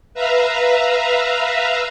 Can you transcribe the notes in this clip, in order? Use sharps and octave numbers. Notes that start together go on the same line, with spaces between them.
B4 E5 F5 A#5